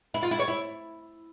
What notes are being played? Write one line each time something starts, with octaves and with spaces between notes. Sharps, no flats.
E4
F4
E4
C#5
E4